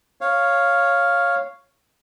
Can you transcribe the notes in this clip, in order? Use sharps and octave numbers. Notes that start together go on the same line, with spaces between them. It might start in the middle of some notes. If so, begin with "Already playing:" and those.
C#5 F5